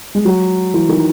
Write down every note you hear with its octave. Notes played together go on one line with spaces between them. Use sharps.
G#3
F#3
E3
D#3